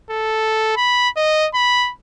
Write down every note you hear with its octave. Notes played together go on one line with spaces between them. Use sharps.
A4
B5
D#5
B5